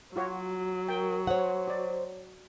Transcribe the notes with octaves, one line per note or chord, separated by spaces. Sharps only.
F#3 F4 F#4 C#5
A#4 G5
C5 C#5 F#5
F#4 D5